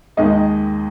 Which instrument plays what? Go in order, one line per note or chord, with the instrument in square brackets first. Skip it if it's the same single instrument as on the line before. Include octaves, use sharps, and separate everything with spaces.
[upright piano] D#2 D#3 G#3 D#4 D#5